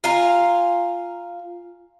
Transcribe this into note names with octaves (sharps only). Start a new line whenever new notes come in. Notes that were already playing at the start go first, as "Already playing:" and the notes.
F4 F5 G#5 A#5